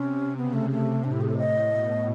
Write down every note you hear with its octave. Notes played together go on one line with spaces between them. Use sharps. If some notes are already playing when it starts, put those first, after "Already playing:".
Already playing: C3 C#4
C#3 B3
A3
C3 A3
A2 D4
E4
G#4
A4
D#5
B2